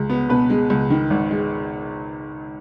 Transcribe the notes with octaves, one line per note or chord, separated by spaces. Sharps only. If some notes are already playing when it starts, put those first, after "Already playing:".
Already playing: C#2 G#3
B3
B2 B4
G#3
C#2
D#3
G#1
G#3